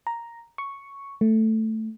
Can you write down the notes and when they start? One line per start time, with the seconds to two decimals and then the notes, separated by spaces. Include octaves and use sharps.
0.07 A#5
0.58 C#6
1.21 A3